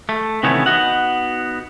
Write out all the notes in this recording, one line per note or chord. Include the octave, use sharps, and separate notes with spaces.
A3
C3 D#3 E3 A3 B3 C#4
B3 D#4 F#4 F#5